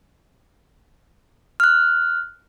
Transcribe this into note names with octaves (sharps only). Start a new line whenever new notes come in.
F6 F#6